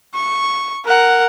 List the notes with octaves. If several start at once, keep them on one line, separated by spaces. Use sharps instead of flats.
C#6
A#4 F#5